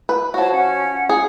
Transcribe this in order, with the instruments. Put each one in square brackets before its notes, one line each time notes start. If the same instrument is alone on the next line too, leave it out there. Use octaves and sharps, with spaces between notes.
[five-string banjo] B4
[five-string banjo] F3 F#4 [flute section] C#5 A5
[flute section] C#4 F#5
[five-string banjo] G#4